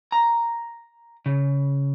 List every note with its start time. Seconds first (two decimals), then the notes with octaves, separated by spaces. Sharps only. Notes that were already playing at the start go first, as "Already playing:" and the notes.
0.12 A#5
1.26 C#3